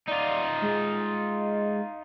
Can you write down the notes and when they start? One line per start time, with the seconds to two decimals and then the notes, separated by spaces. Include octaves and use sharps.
0.08 D#4 F4 D5
0.62 G#3